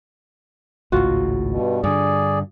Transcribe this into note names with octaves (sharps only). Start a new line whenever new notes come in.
G#1 C#2 A2 F4 F#4
G2 B2
G2 D3 G#4 D5